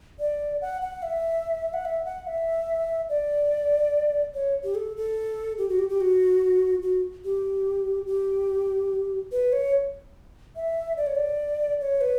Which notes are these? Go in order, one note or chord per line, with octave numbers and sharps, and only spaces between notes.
D5
F#5
F#5
E5
F#5
E5
F#5
E5
D5
C#5
G4
A4
A4
G4
F#4
G4
G4
F#4
F#4
G4
G4
B4
C#5
E5
D5
C#5
D5
C#5
B4